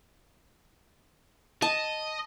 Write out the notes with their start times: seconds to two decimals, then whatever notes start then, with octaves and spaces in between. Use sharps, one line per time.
1.62 D#5 A5